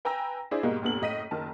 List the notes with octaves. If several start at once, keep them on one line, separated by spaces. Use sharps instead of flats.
B4 G5 G#5 A#5 E6 A#6
D4 E4 G#4 C5 D5
G#2 B2 G3 G#3 A#3
F1 G2 A#2 B3 A4 F#7
F#1 A2 D#5 B6 D#7
F#1 D#3 A#4 A5